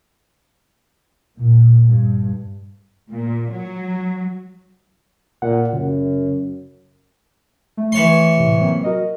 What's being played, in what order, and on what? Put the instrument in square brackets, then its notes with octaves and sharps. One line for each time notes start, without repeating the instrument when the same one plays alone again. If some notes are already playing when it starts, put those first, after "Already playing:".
[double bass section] A#2
G2
[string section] A#2
F#3
[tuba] A#2 [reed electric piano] F#5
[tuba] F#2 [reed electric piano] C#3
[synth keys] A3
[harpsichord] E3 C#5 C6
[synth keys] A2 C3
F#3 A#3 C4
F#4 A#4 D#5